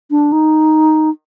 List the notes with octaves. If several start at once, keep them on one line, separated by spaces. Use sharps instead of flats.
D4
D#4